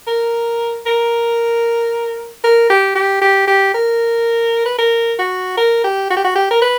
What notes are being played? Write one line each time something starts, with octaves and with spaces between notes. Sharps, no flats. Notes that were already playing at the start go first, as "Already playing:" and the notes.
A#4
A#4
A#4
G4
G4
G4
G4
A#4
B4
A#4
F#4
A#4
G4
F#4
G4
F#4
G4
A#4
B4